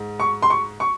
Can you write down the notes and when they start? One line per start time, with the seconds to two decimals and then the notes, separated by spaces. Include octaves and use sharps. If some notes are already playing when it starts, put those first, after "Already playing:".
Already playing: G#2
0.20 C#6
0.42 C6
0.50 C#6
0.80 C#6